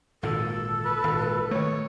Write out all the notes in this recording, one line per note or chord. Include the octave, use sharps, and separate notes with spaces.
G#1 A#2 D3 A4
B4
G#1 A#2
D#3 A3 C#5